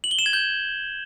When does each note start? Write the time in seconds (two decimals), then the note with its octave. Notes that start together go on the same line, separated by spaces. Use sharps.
0.04 F#7
0.11 G7
0.19 E7
0.26 G#6
0.33 G6